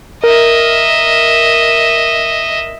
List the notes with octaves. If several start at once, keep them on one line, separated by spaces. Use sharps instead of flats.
A#4 D#5 E5